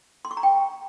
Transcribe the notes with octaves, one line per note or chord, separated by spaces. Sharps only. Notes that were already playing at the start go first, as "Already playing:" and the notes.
C6
C#6
A#5
G5